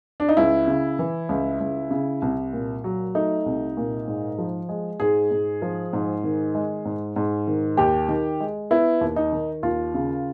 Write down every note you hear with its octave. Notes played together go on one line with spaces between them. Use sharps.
D4
D#4
C#2 E4
C#3
E3
C#2
C#2
C#3
C2
A#2
F#3
A3 D#4
C2
A#2
G#2
F3
G#3
G#2 G#4
G#2
F3
G#2
D#3
G#3
G#2
G#2
D#3
D#2 G4
D#3
G#3
B3 E4
D#2
D#4
D#3
D#2 F4
C#3